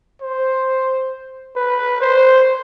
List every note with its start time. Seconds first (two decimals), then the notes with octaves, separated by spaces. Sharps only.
0.22 C5
1.56 B4
2.01 C5